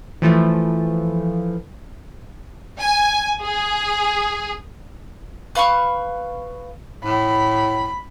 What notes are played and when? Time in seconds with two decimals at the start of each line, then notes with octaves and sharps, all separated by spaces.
0.22 E3 F3 A3
2.80 G#5
3.41 G#4
5.55 B4 F5 B5 C#6
7.04 A2 B5